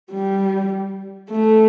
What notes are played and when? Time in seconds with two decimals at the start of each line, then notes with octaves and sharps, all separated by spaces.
0.12 G3
1.31 A3